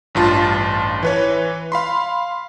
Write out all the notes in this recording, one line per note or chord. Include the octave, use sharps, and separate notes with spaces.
A1 G2 F4 A5
E3 B4 C#5
F5 B5 C6